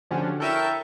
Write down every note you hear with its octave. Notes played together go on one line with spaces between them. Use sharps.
D3 F3 C#4 D4 F#4 G4
E4 A4 A#4 C#5 E5 G5 A5 D#7